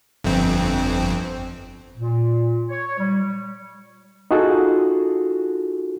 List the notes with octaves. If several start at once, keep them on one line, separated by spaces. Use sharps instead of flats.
G1 F2 C4
A#2
C#5
G3
D#4 F4 F#4 G#4 A4